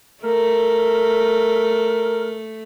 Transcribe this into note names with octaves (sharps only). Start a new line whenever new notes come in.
A3 A#4